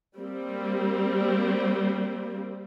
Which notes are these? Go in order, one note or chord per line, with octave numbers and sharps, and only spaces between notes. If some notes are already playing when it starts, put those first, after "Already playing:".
G3 A#3 C4